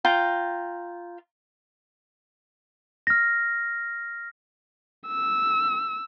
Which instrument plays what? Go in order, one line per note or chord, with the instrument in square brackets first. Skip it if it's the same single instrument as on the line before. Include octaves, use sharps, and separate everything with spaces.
[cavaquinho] F4 G5 A#5
[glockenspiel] F6 A#6
[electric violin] E6